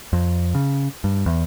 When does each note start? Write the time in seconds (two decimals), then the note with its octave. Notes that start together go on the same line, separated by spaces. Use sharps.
0.13 F2
0.55 C#3
1.04 G2
1.26 E2